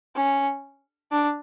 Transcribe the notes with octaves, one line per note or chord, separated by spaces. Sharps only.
C#4
D4